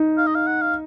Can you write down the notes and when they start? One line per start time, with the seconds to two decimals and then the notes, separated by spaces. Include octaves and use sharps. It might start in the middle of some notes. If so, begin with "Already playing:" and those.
Already playing: D#4
0.18 F5
0.27 D#5
0.35 F5
0.47 F#5
0.61 F5